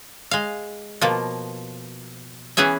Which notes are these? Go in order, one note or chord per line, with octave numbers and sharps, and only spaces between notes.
G#3 F5
B2 F3 A#3
E3 B3 C#4 G#4 E5